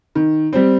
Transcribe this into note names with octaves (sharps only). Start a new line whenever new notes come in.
D#3
G3 C4